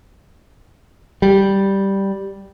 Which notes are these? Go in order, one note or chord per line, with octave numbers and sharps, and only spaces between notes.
G3